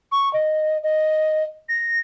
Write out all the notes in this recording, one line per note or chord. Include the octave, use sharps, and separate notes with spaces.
C#6
D#5
D#5
A#6